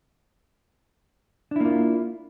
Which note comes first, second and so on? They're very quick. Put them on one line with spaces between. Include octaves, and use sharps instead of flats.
D4 E4 A#3 F4